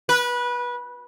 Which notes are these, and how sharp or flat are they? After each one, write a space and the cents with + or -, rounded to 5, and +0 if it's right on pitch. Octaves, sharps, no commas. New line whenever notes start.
B4 -20